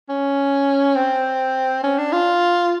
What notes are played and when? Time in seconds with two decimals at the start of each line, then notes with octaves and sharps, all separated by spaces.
0.09 C#4
0.96 C4
1.83 C#4
1.98 D4
2.12 F4